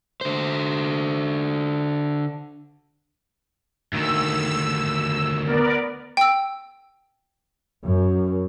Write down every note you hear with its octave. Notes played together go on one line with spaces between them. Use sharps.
D3 C5
D2 D#3 E6
B3 A#4 D5
G5 E6
F#2